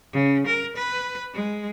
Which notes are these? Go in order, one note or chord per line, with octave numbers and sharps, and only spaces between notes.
C#3
A#4
B4
G#3